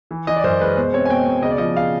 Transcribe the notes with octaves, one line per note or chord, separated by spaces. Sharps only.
E3
E3 D#5
D5
F#2 C5
G#3 B4
B2 C5
C4 C#5
G#5
B2 G5
B2
C#3 D#5
D5
F3 D#5
C#3 F5